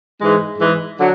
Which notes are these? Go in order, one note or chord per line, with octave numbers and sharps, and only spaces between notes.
G#2 E3 G#3
G#2 E3 G#3
D3 F#3